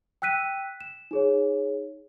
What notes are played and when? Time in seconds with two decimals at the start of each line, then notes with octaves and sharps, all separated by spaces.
0.22 G5 E6 F#6 B6 D#7
0.81 E7
1.11 D#4 G#4 C#5